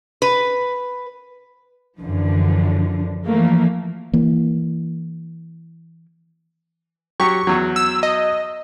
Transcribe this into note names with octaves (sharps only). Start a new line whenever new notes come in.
B4
F#2 D3 E3 F3
E3 F3 A3 A#3
E3 A#3
F#3 G4 C#6
E2 F#3
E6
D#5